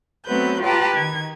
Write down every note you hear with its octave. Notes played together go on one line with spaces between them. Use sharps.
F#3 A3 B3 C4 B4 G6
F4 G4 B4 G5 A5 A#5
D#3 G#6